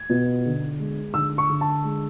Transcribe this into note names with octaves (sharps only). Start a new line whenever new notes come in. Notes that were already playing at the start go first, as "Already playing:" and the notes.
Already playing: G#6
B2
D3
G#3
D3 E6
C#6
D3
A5
G#3